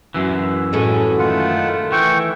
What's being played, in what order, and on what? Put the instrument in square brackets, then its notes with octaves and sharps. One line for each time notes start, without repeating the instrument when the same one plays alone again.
[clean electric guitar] F#2 E3
[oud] A2 G#3 A4 [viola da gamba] C#4 F#4
[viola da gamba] D#3 A3 [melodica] F4 F#5
[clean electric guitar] E3 [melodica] G5 C#6